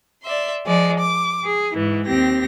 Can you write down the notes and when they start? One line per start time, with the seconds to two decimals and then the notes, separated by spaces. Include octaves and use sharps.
0.23 D5 E5 C6
0.66 F3 G#3 D5
0.99 D6
1.43 G#4
1.72 G#2 E3
2.06 D#2 C4 G4 A#6